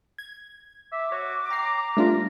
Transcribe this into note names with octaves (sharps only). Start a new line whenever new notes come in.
G#6
E5 D6
F#4 C#5
G5 A#5 C7
G3 A3 B3 D4 F4